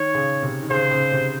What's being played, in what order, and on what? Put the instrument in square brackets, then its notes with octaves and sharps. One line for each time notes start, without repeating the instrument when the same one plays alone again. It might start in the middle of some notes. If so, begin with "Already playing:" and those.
Already playing: [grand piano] D#3 [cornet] C#5
[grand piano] C#3
C3
D#3
[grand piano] C#3 [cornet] C5
[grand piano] C#3
C3